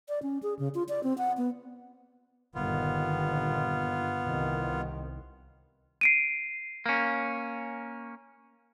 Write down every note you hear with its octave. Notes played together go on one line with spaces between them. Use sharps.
D5
C#4
G#4
C#3
F4
D5
C4
F#5
B3
G1 A#2 D#3 B3 F4
C2 D#3
C7 D7 D#7
A#3 C#4